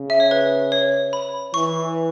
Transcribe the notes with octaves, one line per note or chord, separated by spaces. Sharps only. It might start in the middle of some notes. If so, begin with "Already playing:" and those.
Already playing: C#3
E5
C#5
B4
C#5
B5
E3 C#6